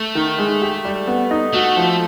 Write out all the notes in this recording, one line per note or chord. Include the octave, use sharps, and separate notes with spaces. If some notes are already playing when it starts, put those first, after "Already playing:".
Already playing: A3
D#3
G#3
G4
G3
B3
D#4
A3 F#4
F3